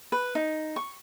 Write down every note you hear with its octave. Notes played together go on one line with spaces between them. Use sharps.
B4
D#4
C#6